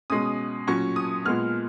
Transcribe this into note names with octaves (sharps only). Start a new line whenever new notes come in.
B2 G#3 C#4 D#6
A#2 F#3 C#4 C#6
D#6
A#2 G#3 B3 F6